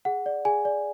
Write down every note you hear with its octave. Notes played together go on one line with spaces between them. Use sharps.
G#4 F#5
D5
G#4 G#5
D5